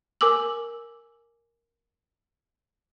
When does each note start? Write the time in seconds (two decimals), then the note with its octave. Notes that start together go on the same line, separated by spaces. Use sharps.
0.21 A#4 G#5 D6 E6 F#7